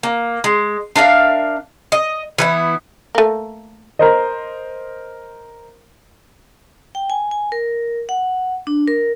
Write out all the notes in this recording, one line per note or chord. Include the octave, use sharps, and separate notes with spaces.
A#3
G#3
D4 A#4 E5 F5
D#5
E3 B3 E4
A3 A#3
A#4 C5 D#5
G5
G#5
G#5
A#4
F#5
D4
A#4